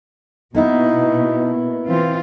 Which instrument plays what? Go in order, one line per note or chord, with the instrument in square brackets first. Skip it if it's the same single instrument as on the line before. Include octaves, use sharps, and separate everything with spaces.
[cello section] B2 [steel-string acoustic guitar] A#3 B3 E4 [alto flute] D#4
[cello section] E3 F4 [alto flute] C4